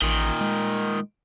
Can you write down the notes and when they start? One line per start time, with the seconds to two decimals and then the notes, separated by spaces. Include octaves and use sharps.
0.02 A1 A#2 D#3
0.41 G#3